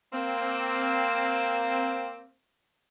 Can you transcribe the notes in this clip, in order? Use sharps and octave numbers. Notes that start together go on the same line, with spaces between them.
A#3 C4